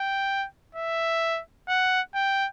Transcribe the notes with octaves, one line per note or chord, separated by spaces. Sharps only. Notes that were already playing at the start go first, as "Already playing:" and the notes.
Already playing: G5
E5
F#5
G5